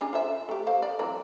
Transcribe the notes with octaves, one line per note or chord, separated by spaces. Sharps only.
C#4 D4 G#4
F4 C5 E5
A3 G4
A3 C5 F5
D5
E3 F#3 C4